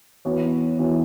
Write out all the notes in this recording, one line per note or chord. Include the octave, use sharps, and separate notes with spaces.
E3 B3 F#4 C#5
E3 B3 F#4 C#5